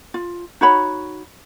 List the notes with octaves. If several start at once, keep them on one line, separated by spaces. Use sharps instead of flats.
F4
D#4 F#4 C#5 B5